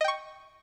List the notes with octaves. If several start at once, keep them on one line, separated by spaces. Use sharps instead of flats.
D#5 G5 C#6